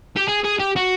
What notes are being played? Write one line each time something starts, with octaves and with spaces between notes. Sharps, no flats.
G4
G#4
G#4
G4
F#4